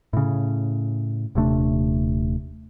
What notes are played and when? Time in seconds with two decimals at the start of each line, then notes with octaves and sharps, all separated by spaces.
0.13 A2 C#3
1.35 D#1 C3 A3 D4